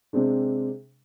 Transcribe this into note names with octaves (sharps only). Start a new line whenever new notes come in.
C3 G#3 C4 D4